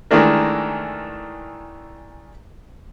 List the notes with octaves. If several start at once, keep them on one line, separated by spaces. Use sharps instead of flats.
D#3 E3 G#3 A3 D4 A#4